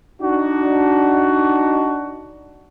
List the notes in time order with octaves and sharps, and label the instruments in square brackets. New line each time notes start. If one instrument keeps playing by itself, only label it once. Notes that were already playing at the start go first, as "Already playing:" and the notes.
[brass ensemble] D4 D#4 F#4